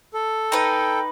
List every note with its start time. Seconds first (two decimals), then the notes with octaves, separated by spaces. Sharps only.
0.14 A4
0.52 D#4 B4 G5